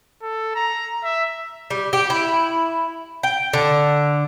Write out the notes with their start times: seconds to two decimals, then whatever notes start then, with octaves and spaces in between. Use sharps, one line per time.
0.22 A4
0.55 A#5
1.03 E5
1.70 G3
1.93 G4
2.10 E4
3.23 G5
3.53 D3